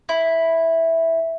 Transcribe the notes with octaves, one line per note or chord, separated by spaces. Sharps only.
E4